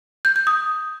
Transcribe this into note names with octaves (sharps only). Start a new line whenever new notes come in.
G6
G6
D#6